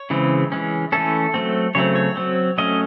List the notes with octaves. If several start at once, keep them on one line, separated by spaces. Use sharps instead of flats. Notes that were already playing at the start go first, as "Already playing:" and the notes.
Already playing: C#5
C#3 E3 G#3 C4
E3 G#3 C#4
E3 A3 C#4 A4
F#3 A3 C4
C#3 F#3 A3 C4 C#5
C#5
F#3 C4
F#3 A3 C#4 D#5